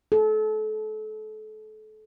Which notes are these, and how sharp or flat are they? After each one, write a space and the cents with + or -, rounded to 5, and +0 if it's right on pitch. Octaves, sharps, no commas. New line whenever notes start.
A4 -30